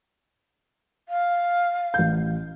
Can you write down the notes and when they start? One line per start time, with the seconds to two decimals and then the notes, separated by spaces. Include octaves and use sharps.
1.09 F5
1.94 A1 G6